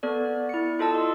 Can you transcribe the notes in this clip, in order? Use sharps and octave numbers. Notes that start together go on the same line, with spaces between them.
B3 A4 D5
E4 C#7
F4 A4 D#5 A5 E6
C6